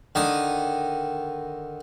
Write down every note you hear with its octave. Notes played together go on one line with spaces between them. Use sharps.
D3 D#3 D#6